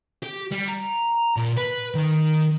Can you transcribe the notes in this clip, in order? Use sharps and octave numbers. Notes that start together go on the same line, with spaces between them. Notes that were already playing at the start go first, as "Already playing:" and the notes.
G4
G3
A#5
A#2
B4
D#3